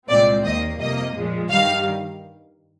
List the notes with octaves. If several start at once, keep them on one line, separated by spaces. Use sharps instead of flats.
C2 A#2 G#3 C4 D5
D#2 D#3 A#3 D#5
F2 C3 G3 A#3 D#5
A#2 F3 G#3
G2 D#3 G3 F5